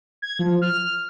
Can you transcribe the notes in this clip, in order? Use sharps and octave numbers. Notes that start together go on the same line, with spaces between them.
G#6
F3
F6